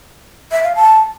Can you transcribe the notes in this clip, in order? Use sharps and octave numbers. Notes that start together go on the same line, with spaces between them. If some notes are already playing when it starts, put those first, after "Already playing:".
E5
F5
A5